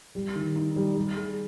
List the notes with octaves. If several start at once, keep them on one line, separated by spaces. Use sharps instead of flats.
G3
D#3
D#4
G3
G3
G#4